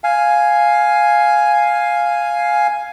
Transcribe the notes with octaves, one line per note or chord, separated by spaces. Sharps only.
F5 G#5